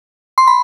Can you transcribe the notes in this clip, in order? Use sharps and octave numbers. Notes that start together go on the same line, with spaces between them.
C6
B5